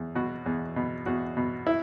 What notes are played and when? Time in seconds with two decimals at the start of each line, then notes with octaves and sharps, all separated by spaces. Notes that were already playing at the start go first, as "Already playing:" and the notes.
Already playing: E2
0.15 B2 F#4
0.46 E2
0.76 B2
1.06 E2 F#4
1.37 B2
1.67 E4